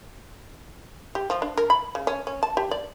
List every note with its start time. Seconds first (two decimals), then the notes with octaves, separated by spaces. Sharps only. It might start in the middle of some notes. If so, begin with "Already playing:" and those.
1.15 G4
1.30 F3
1.42 D4
1.57 A#4
1.70 B5
1.95 C#3
2.07 C#4
2.27 C#4
2.43 A5
2.57 G4
2.71 D5